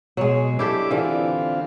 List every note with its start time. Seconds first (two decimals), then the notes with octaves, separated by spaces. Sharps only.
0.17 B2 F#3 G#3
0.59 D4 E4 G4 A4 D6
0.91 D3 E3 C4 F4